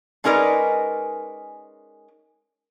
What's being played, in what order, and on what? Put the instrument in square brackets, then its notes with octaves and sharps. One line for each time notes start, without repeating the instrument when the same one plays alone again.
[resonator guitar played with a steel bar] G#3 C#4 D#4 A#4 B4 D5